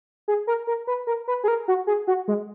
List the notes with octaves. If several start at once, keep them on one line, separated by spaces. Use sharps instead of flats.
G#4
A#4
A#4
B4
A#4
B4
G#4
A#4
F#4
G#4
F#4
G#3